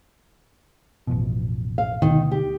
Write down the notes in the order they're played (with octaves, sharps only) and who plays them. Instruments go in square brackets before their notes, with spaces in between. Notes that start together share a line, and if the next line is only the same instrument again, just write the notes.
[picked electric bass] A1 F2 B2
[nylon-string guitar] F5
[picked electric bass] D2 B2 [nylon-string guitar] D#3
[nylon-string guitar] G4